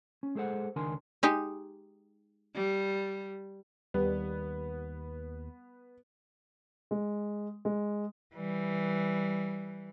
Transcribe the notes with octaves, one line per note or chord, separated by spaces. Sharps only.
C#4
G#3 G#4 A4 C5 F#5
C#2 D#3 D4 A#4 G#5 C6
G#3 D#4 G4
G3
D#2 G3 B3
G#3
G#3
E3 G3